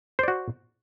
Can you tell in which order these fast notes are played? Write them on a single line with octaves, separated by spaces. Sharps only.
C5 D5 F#4